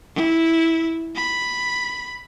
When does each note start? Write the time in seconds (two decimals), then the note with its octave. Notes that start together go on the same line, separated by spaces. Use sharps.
0.16 E4
1.16 B5